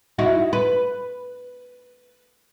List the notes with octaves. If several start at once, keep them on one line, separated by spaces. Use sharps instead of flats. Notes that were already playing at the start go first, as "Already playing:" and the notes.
D#4 E4 F#4
B4